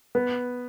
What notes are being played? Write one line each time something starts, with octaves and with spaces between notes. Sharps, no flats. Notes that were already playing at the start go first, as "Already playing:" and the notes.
B3